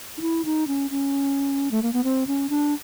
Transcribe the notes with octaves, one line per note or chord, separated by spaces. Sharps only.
D#4
E4
D#4
C#4
C#4
A3
A#3
B3
C4
C#4
D4